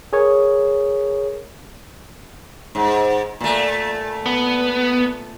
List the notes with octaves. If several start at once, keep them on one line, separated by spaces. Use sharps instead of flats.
G#4 A#4 C#5
G#2
A#2 A3
B3